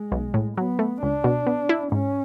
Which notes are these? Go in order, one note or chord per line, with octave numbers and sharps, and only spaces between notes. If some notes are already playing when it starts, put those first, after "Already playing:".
Already playing: G#3
B1
A2
F#3 B3
A3
C#2 D4
B2
B3
E4
G#2 C#4